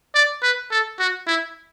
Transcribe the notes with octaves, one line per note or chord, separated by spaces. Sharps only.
D5
B4
A4
F#4
E4